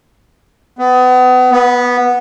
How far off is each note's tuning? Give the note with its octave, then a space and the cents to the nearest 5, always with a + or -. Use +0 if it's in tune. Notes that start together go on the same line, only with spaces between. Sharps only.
B3 +30
B3 -10